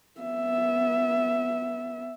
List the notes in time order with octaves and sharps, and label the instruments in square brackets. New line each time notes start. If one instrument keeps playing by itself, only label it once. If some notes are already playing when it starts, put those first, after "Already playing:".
[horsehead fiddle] B3 E5